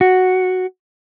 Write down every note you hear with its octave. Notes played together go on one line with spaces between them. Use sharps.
F#4